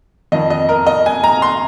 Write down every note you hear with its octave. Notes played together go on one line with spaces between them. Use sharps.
F2 D#3 D#5
D#5
A#4
D#5
G#5
A#5
C6